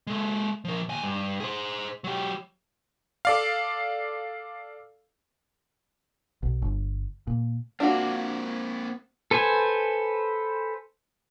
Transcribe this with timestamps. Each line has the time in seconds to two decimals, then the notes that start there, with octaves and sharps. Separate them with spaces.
0.07 G#3 A4
0.65 F3 A#4
0.89 D#2 G#5
1.03 G2
1.40 G#4 C5
2.04 F#3 G4
3.25 A4 D5 F5
6.43 B1
6.62 G1
7.27 A#2
7.80 A#3 C4 D4 F4 F#4
9.31 A4 B4 C5 G#5